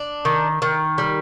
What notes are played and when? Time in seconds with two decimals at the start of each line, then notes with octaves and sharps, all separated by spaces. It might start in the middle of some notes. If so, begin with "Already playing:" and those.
Already playing: D4
0.25 D#3
0.62 D#3
0.98 G3